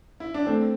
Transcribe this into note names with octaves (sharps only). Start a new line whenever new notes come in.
E4
D4
A3 C4